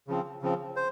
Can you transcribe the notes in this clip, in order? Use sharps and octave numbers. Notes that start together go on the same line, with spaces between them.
C#3 F3 C4
C#3 F3 C4
C5